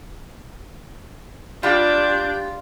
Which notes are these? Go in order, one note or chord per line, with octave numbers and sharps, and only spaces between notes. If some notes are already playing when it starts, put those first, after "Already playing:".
G3 D4 F4 G4 G6